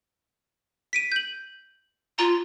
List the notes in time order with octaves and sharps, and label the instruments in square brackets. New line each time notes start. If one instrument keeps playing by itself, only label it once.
[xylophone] B6 D7 D#7
G6 F#7
[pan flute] F4 [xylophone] A#5